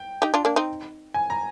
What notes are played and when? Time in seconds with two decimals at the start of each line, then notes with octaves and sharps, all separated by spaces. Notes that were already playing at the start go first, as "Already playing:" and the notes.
Already playing: G5
0.22 D#4 G4
0.34 D4 F4
0.45 A#3 D4
0.56 C4 D#4
1.14 G#5
1.30 A#5